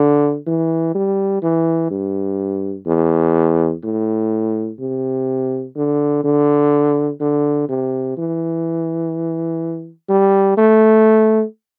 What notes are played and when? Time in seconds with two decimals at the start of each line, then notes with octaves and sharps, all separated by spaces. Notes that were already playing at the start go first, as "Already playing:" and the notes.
Already playing: D3
0.47 E3
0.95 G3
1.42 E3
1.90 G2
2.87 E2
3.84 A2
4.80 C3
5.76 D3
6.24 D3
7.21 D3
7.69 C3
8.18 E3
10.09 G3
10.58 A3